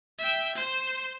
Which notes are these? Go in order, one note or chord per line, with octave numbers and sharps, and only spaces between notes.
E5 G5
C5